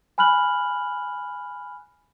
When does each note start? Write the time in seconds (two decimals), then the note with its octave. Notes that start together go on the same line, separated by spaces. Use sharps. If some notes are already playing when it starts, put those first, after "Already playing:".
0.18 G#5 B5 F6 F#6 F#7